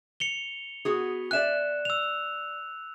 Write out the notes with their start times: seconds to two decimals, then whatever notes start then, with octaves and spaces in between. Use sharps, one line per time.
0.20 C#7 F7 G7
0.85 B3 F#4 G#4
1.31 D5 E5 G#5 F#6 E7
1.85 E6 F7